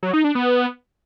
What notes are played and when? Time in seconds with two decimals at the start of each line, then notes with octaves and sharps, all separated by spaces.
0.03 F#3
0.14 D#4
0.24 D4
0.35 B3